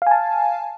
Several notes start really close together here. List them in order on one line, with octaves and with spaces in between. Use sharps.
F5 G#5 A5